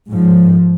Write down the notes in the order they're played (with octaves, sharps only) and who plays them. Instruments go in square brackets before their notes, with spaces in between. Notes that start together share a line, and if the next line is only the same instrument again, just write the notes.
[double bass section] G#2 F3